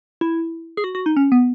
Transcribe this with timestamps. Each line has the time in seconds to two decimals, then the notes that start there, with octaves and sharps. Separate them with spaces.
0.21 E4
0.77 G#4
0.84 F#4
0.95 F#4
1.06 D#4
1.17 C#4
1.32 B3